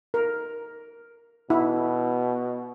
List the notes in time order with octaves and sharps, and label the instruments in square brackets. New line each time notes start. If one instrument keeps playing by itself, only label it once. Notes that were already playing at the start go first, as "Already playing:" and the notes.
[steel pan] A#4
[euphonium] B2 [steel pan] E4